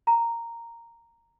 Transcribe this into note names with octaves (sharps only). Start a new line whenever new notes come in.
A#5